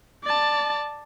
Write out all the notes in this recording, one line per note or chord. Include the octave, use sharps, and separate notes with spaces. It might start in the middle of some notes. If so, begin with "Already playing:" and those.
D5 A5